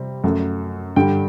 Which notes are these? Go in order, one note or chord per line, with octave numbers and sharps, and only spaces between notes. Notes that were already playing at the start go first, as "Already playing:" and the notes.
Already playing: C3 G3 C4
F#2 F#3 A3
G2 D3 G3 G5